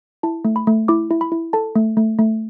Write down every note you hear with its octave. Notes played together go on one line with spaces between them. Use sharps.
E4 A5
A3
B5
A3
E4 D6
E4
B5
E4
A4 A5
A3
A3
A3